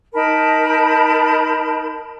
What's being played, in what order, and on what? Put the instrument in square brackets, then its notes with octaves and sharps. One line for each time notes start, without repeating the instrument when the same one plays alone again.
[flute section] D#4 A#4 A5 B5